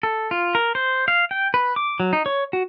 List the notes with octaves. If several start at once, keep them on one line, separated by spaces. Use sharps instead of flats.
A4
F4
A#4
C5
F5
G5
B4
D6
F#3
D#4
C#5
F#4